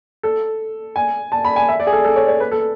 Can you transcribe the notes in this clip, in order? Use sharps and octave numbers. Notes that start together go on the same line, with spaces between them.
A4
G#5
A5
B5
G#5
E5
D5
G#4
A4
A4
C#5
C#5
B4
A4